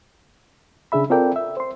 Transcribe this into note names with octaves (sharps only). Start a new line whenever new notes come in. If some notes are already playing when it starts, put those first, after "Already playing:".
C#3 D4 G#4 E5 B5
C4 F4 A4 A#4 D5 G5
E5
C5 C6